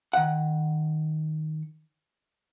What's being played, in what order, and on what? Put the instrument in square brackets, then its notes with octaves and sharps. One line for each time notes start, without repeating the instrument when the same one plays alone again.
[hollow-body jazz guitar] D#3 F#5